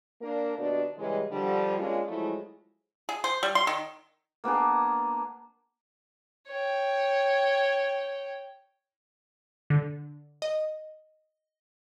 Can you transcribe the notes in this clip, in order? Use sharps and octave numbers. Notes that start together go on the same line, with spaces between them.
A#3 D4 A#4
D#2 B2 D4 D#4 F#4 D5
C#3 E3 G3 G#3
D3 F3 G3
G#3 A#3 C#4 D4 F4
F3 F#3 G#3 A3 E4
G#4
C5
G3
C6
D#3
A#3 B3 D4 G#4
C#5 G5
D3
D#5